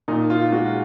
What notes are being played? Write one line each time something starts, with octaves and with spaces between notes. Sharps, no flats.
A#2 D#4
F4
G#3 F#4